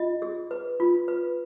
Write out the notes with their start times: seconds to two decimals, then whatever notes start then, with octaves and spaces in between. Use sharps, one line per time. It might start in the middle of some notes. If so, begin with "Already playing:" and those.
Already playing: F4 D#5
0.22 G#4
0.51 B4
0.80 F4
1.08 B4